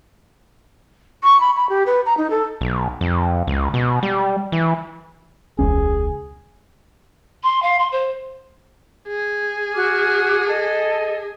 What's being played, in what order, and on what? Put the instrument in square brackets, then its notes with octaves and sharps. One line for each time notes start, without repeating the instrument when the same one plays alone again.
[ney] C#6
B5
B5
G4
B4
A#5
D#4
A4
[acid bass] B1
F2
C#2
B2
G3
E3
[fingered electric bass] E1 C#2 C#4 [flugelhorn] G#4
[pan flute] C6
F5
C6
C5
[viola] G#4
[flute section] F#4 D6 F6
A4 D#5